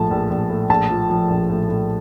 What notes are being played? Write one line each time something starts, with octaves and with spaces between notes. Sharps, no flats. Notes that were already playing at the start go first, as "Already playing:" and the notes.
Already playing: A#1 A2 F3 A5
A#1
A#1
A2
A#1 A5
F3
F3
A#1
A2
A2